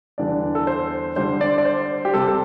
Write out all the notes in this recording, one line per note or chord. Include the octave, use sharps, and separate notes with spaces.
E2 D3 G3 D4 D5
A4
C5
D3 G3 D4 C5
D5
D5
C5
G4
C3 G3 C4 A4
A4